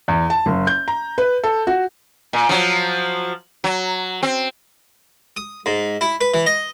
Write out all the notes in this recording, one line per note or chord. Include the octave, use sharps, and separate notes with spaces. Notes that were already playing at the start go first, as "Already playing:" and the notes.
E2
A5
F#1
G6
A#5
B4
A4
F#4
A#2
F3 F#3
F#3
C4
D#6
G#2
E4
B4
E3
D#5